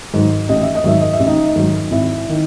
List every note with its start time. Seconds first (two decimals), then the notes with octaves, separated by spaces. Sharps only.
0.13 G#2 D#3 F#3
0.49 A1 D#5
0.62 E5
0.75 D#5
0.84 G#2 D#3 F#3 E5
1.01 D#5
1.13 E5
1.20 A1
1.27 D#4 D#5
1.56 G#2 D#3 F#3
1.91 G#1 E4 E5
2.29 D#3